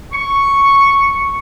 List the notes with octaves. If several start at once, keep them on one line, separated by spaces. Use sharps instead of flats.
C#6